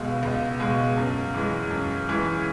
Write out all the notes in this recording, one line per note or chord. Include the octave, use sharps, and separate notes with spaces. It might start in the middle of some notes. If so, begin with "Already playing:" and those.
Already playing: C#2 B2 G#3
C#2
B2 G#3
F#2
E3 G#3
F#2
E3 G#3